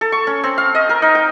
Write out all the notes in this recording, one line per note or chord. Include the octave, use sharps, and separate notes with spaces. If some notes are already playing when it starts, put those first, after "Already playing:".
A4
C#6
C#4
C4
F5
D#5
A#4
D#4
G5